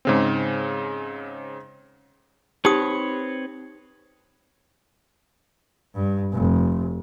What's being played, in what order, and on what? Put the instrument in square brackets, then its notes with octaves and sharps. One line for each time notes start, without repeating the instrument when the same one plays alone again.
[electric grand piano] G#2 C#3 C4
[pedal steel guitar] C4 B4 C#5 [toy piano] D#4 G4 D#6
[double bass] G2
F1